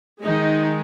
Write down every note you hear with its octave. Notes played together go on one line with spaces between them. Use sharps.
D#3 G#3 D#4